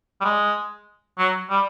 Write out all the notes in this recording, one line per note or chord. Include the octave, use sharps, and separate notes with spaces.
G3
G#3
F#3
G3